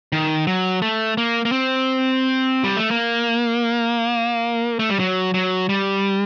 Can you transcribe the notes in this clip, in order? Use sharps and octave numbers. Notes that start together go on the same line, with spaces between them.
D#3
F#3
A3
A#3
A#3
C4
G3
A3
A#3
A3
G3
F#3
F#3
G3